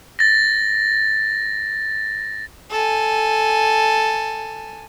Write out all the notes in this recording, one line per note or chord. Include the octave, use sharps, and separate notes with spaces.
A6 A#6
A4 G#5